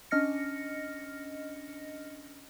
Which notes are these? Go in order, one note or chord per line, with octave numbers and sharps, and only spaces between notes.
C#4 D4 D#5 F6 A#6 C#7